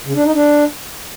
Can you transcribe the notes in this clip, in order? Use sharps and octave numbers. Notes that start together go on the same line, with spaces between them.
C#3
D4
D#4
D4